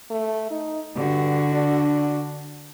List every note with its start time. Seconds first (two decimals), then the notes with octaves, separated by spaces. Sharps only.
0.10 A3
0.50 D#4
0.97 G2 D3 F#4
1.53 D4